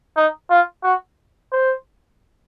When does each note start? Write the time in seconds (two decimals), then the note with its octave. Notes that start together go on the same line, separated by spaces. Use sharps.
0.16 D#4
0.50 F4
0.83 F#4
1.52 C5